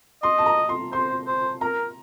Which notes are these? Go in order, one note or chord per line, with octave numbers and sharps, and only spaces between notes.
D#5 C6
A5
A#5
C6
C5 C6
C5
A#4 A#5